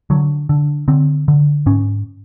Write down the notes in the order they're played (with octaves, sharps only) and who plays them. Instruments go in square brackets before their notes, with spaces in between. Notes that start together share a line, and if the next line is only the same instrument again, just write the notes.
[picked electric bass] D3 F#3
D3
D3 C4
D3
G#2 C#4